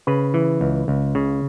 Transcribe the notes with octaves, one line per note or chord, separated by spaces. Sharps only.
C#3 B4
E3
C#2
C#2
C#3